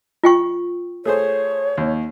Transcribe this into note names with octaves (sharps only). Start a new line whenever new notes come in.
F4 G5 C#6
A3 G#4 C5 C#5
D#2